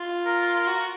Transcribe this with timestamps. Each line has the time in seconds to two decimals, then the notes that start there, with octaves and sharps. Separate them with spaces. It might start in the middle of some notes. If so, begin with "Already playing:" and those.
Already playing: F4
0.26 A#4
0.67 F#4